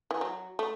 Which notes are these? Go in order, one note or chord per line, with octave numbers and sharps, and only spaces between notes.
E3
F#3
A3